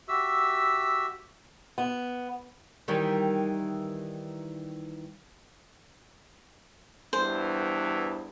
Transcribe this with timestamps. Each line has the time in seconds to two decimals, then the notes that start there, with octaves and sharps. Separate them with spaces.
0.08 F#4 G4 E5 E6
1.78 B3
2.88 D#3 E3 G3
7.13 E2 G2 E3 C5